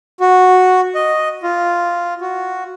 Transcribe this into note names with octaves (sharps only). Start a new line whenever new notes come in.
F#4
D#5
F4
F#4